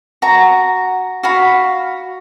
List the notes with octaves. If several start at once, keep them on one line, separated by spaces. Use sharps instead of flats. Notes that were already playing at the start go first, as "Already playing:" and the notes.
F#4 A#5
F#4 F5 B5